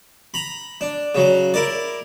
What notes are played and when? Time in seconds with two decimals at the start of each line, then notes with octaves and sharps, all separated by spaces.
0.34 A#5 B5
0.81 D4
1.15 C#3 F#3
1.54 E4 A#4 D5